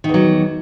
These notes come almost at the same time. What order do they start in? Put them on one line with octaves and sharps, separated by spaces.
D#3 E2 F#3